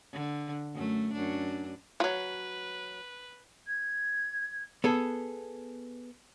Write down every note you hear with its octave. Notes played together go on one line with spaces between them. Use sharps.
D3
F#2 A3
F#2 D4
F3 F#3 B4
G#6
B3 G#4 A4